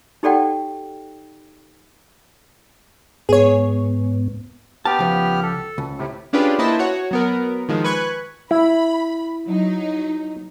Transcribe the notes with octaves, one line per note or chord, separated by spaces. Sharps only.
D#4 G4 A4 D5 F#5 G5
G#2 B3 G#4 C#5
B3 G4 G5 A5 F6
C#2 F3
A4
C#2
A2 C3
C#4 D4 F4 G4 G#4 B4
A#3 E4 B4 C5 D#5 A5
F#4 C#5 F#5
F#3 B3 A#4
D#3 F3 G#3
B4 G#5 C#6 F#6 G#6
E4 B5
F#3 D#4